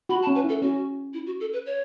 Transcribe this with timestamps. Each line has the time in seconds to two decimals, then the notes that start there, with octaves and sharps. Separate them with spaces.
0.09 F#4 B5
0.22 A5
0.27 C#4
0.35 B4
0.44 E4 A4
0.62 C#4 F#4
1.14 E4
1.26 F#4
1.40 A4
1.53 B4
1.66 C#5